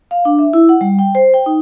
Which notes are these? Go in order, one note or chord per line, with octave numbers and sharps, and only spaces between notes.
F5
D4
E5
E4
F#5
G3
G5
C5
G5
D#4